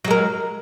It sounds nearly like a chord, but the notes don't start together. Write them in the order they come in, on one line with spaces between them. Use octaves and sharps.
F#3 G#3 A#4